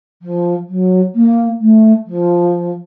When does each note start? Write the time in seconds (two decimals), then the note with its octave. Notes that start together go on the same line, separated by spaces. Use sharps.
0.22 F3
0.68 F#3
1.15 A#3
1.60 A3
2.07 F3